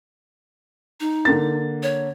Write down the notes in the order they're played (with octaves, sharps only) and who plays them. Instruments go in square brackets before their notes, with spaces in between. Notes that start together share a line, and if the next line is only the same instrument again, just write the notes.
[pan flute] D#4
[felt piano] D3 A#3 A6
[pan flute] C#5